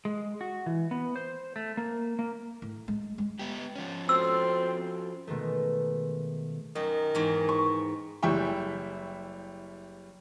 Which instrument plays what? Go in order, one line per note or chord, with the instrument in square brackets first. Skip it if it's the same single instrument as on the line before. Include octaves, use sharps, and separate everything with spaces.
[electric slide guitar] G#3
F#4
E3
B3
C5
A3
A#3
A#3
[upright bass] A2
G#3
G#3
[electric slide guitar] B3 G4
F3 C#4
[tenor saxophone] C4 [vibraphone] F4 F#4 A4 [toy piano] E6
[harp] B2 D#3 G#3 A3
[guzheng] F#2 [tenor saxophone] D#3
[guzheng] E2 G#2
[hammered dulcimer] C#6
[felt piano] F#1 G3 E4 E5 G5 C#6